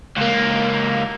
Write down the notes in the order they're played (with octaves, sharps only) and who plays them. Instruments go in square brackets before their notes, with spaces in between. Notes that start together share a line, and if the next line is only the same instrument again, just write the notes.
[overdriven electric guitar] C#2 A#3